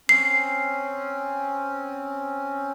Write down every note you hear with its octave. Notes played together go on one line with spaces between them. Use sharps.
C4 C#4 C7